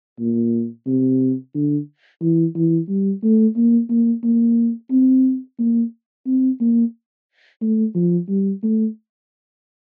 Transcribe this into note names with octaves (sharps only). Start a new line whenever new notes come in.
A#2
C3
D3
E3
E3
G3
A3
A#3
A#3
A#3
C4
A#3
C4
A#3
A3
F3
G3
A3